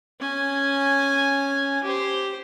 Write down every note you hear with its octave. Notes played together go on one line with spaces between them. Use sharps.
C#4 G#5
G4 C5